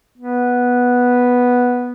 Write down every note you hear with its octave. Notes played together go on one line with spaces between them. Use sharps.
B3